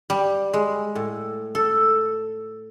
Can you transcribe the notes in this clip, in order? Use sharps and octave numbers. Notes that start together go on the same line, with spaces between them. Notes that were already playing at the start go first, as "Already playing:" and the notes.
G3
G#3
A2
A4